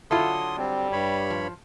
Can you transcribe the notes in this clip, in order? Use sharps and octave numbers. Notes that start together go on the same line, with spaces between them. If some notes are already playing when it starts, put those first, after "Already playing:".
D3 F#3 E4 F4 A4 C6 D#6
G3 C4
G2 C#5 B5
F3